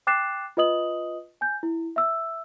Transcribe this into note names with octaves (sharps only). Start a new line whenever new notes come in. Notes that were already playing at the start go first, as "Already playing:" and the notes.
G5 D6 F#6 A6 C7 E7
F4 B4 D#5 D#6 F#7
G#5 G6
E4
E5 E6